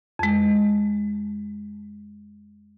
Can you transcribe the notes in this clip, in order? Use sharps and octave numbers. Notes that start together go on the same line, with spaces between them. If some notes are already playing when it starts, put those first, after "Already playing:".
F2 G#3